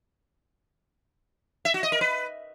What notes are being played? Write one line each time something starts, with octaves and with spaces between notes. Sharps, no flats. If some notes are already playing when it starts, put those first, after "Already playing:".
E5
F#4
D#5
A#4
B4